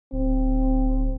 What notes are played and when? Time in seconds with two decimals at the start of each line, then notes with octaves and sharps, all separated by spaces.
0.12 D1 C4